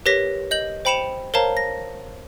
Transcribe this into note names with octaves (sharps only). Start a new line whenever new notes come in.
G4 A#4 B4 C#5 A#6 B6
D#5 G6 F#7
C5 G5 B5 C#7 E7 F7
A#4 C5 C#5 F5 A5 A#5
A#6